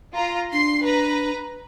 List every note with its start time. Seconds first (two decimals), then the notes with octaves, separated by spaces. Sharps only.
0.14 F4 A#5
0.53 D4 C6 C7
0.84 B4 A#5